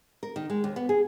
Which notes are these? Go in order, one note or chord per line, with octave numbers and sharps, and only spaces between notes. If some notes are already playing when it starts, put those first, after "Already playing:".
A#4
D#3
G#3
D#2
B3
G#4